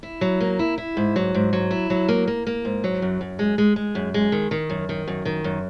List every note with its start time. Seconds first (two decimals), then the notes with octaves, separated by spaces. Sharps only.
0.03 E4
0.21 F#3
0.41 A#3
0.59 E4
0.78 E4
0.97 G#2
1.16 F#3
1.35 G#2
1.53 F#3
1.71 E4
1.90 F#3
2.09 A#3
2.28 A#3
2.47 A#3
2.65 G#2
2.84 F#3
3.02 F#2
3.21 F#2
3.39 G#3
3.58 G#3
3.76 G#3
3.95 F#2
4.14 G#3
4.32 D#3
4.51 D#3
4.70 F#2
4.89 D#3
5.08 F#2
5.25 D#3
5.44 F#2